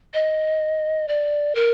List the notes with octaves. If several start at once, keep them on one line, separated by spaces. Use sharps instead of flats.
D#5
D5
A#4